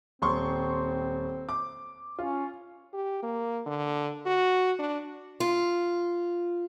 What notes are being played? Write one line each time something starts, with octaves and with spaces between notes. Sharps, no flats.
D#1 C4 C6 C#6
D6
C#4 F4
G4
A#3
D3
F#4
D4
F4